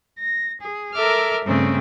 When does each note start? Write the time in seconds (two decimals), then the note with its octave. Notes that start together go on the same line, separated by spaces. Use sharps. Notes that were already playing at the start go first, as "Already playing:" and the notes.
0.17 A#6
0.60 G#4
0.93 A4 A#4 E5 D6 F6
1.43 G2 C#3 A3 C4